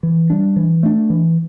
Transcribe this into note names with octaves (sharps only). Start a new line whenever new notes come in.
E3
G3 D4
E3
A3 D4
E3